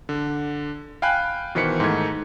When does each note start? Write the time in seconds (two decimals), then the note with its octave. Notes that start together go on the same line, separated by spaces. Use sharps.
0.09 D3
1.02 F5 G5 G#5 B5 F#6
1.55 B2 D#3 E3 C5 B6 C#7
1.80 G#2 D#3 A3 G#6